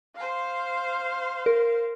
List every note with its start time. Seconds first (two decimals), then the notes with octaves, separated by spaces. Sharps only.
0.16 C5 F5
1.46 A#4